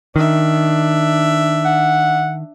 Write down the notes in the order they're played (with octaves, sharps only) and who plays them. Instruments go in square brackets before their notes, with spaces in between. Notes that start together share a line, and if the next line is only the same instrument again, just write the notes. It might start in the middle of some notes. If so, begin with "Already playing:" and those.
[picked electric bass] D#3 [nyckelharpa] D4 E5
[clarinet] F#5